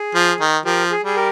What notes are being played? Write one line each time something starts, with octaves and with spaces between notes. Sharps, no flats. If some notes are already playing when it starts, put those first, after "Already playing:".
Already playing: G#4
F3
D#3
F3 G4 A#4
G#4
G3 G#4
G4 A#4